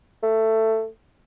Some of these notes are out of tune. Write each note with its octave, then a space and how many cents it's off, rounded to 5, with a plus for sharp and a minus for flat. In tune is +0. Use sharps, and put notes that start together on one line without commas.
A3 +15